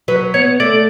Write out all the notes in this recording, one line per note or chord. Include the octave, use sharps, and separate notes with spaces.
F#3 B4
B3 C#5
A3 D5